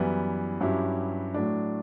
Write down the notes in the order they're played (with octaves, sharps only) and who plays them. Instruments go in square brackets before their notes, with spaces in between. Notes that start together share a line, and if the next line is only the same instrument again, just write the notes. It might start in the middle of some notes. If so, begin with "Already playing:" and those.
Already playing: [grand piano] F#2 E3 G3 B3 E4
G2 F#3 C#4 E4 G4
A2 F#3 A3 D4